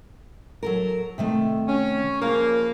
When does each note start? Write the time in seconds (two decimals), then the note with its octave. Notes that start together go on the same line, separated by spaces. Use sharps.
0.63 F#3 A4 A#4
1.18 C3 D#3 A3
1.67 C#4
2.21 C#3 F3 A#3 A#4